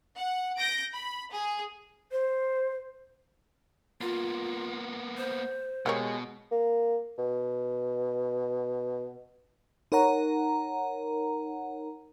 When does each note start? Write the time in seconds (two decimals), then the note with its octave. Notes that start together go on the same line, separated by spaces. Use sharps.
0.17 F#5
0.58 G6 A#6 D7
0.93 B5
1.33 G#4
2.12 C5
4.01 A#3 B3 F4
5.17 C5
5.86 B2 G#3 A#3 G4 C#5
6.52 A#3
7.18 B2
9.92 D#4 A#4 C#5 F#5 A#5